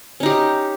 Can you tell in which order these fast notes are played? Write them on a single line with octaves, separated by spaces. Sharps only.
C#4 D#4 G4